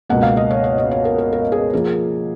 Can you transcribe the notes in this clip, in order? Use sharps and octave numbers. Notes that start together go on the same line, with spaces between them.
C#2 B2 A#3 F#5
F5
D#5
C#5
C#5
D#5
C#5
A#4
A#4
A#4
G#4
F3 A#3 G#4